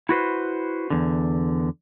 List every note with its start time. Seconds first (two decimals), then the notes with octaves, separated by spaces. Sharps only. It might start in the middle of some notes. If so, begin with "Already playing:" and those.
0.09 E4 F#4 B4 C5
0.90 E2 D3